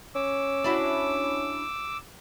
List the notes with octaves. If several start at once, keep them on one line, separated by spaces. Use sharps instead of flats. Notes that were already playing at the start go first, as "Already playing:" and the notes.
C#4 D6 E6
D4 E4 F#4